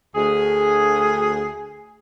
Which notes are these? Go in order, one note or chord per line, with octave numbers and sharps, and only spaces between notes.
D2 G#4